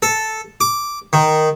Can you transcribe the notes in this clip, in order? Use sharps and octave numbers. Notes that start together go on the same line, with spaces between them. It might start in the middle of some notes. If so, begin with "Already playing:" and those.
A4
D6
D#3